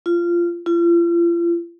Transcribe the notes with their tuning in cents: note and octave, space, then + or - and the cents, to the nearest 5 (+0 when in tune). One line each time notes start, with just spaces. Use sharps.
F4 -20
F4 -40